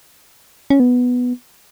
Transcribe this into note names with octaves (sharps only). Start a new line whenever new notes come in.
C#4
B3